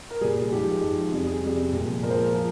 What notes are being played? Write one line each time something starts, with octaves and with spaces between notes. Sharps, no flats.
A#4
A#2 G3 G#4
G#2 F3 G#3 G4
G#2 F3 G#3
F2 C3 G3 G#4
G#4
F2 C3 G3
A#2 F3 G#3
A#2 F3 G#3 A#4
C5
A#4
F3 G#3